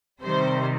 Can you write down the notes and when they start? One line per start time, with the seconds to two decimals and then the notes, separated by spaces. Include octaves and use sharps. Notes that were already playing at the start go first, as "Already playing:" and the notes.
0.22 C3 D#3 G3 C5